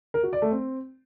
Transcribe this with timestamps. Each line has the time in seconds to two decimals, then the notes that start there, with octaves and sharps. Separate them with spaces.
0.14 A#4
0.23 F#4
0.33 D5
0.42 A3
0.51 C4